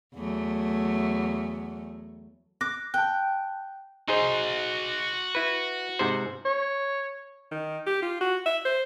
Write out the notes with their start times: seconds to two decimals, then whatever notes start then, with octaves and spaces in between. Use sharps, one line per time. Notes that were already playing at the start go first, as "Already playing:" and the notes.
0.15 E2 F#3 A3
2.61 D6 F#6 A#6
2.94 G5 A5 F#6
4.08 D#4 F#4 G#4 C5 C6
5.35 E4 B4
5.99 G#2 C3 C5
6.45 C#5
7.51 D#3
7.87 G4
8.03 F4
8.21 F#4
8.46 E5
8.65 C5